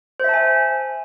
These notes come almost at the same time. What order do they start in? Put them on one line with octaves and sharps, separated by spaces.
C5 E5 A5 G#5